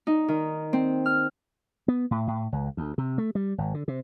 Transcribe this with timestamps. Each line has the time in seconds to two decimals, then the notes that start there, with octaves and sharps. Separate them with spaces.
0.07 D#4
0.28 D#3
0.73 C4
1.06 F6
1.88 B3
2.11 A2
2.27 A2
2.52 C#2
2.77 D2
2.98 C3
3.18 A3
3.35 G3
3.58 G#1
3.74 D3
3.88 C3